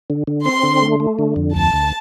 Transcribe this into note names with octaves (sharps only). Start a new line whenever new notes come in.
D3
D3
C4 C6
D3
A3
A3
D3
F2
D2 A5
D2